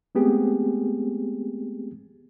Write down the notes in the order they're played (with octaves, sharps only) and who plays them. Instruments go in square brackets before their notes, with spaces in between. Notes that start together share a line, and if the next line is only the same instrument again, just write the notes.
[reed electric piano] G#3 A3 B3 C4 G4 G#4